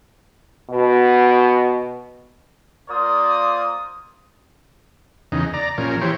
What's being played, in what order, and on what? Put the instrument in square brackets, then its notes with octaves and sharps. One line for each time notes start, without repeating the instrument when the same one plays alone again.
[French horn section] B2
[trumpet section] A#3 F4 A#4 C5 D5 D#6
[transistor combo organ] E2 C#3 D#4
D5 A#5
A#2 F3 C#4 A#4
E3 G4 C5 C#5